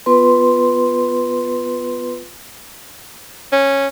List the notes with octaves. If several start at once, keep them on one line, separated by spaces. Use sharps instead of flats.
B3 F4 B4 C6
C#4